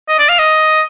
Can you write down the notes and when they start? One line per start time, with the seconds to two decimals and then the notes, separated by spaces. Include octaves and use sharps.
0.09 D#5
0.18 D5
0.29 F5
0.39 D#5